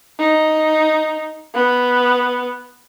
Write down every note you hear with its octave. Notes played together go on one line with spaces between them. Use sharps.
D#4
B3